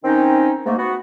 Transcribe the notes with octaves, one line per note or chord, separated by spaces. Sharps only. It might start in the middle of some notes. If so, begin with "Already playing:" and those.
D#3 C4 C#4 D#4
G#2 A3 A#3
B3 F#4